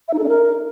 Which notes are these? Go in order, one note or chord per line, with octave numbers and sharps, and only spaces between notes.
E5
D#4
A4
D4
A#4